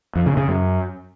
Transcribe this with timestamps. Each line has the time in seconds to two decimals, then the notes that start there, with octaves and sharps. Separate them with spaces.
0.16 F2
0.26 C#3
0.37 C#3
0.48 F#2